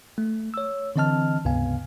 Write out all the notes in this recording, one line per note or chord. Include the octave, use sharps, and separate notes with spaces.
A3
C#5 E6
D3 E3 C4 D#5 A5 F6
C#2 G2 C3 B3 F5 G#5